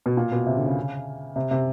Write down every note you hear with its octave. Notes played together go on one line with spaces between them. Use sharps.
B2
A#2
B2
C3
D3
C#3
C3
C3